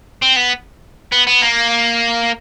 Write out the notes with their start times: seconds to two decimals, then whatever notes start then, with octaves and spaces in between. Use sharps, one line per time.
0.22 C4
0.36 B3
1.12 B3
1.27 B3
1.42 A#3